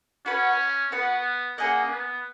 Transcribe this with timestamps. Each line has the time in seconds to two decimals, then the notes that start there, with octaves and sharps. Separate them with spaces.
0.26 C#4 F#4 B4 F#5
0.92 B3 F#4 B4 F#5
1.58 A#3 C#4 G#4 D#5 F#5
1.90 B3